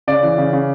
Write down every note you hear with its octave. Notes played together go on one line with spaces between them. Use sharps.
C#3 D5
E3
C#3
C#3